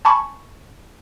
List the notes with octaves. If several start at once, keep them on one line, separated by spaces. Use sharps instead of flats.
G#5 A5 B5 C#6